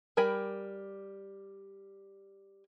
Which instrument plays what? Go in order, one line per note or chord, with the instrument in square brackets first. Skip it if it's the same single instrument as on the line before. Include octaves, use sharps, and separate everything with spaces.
[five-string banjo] G3 A#4 G5 G#5 B5